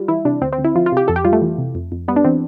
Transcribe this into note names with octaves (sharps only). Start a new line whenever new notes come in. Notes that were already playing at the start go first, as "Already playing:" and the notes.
Already playing: G3 F4
E3 E4
C3 D4
D2 C4
C4
D2
E4
F3 F4
F4
C3 G4
F2 A4
G4
G3 F4
A3
E3
C3
F2
F2
G3 B3
D4
E3 C4